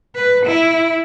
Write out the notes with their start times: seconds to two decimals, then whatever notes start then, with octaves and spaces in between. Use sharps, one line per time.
0.15 B4
0.46 E4